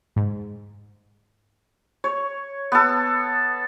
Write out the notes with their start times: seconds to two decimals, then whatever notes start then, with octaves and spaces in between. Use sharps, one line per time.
0.16 G#2
2.04 C#5
2.72 B3 A4